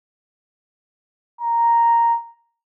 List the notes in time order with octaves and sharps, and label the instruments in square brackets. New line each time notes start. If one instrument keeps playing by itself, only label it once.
[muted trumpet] A#5